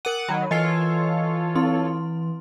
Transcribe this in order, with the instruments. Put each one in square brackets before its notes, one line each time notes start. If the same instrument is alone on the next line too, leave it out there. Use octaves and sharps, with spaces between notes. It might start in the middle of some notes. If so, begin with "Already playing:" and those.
[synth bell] A#4 D#7 [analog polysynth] F#5 D6
[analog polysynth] D#3 F#3 [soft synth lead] B5
[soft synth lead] E3 [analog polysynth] F4 A4 C#5 [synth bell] D#5 G#5 C7
[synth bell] C4 E4 C6